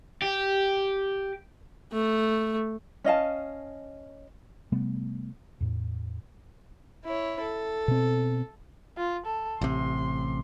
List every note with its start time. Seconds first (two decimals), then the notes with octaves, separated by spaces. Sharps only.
0.22 G4
1.92 A3
3.04 C#4 D#5 F5 A5
4.72 C3 G3 A3 B3
5.60 E2 A2
7.05 E4 C#5
7.41 A4
7.88 B2 C4
8.97 F4
9.26 A4
9.61 A1 C3 C6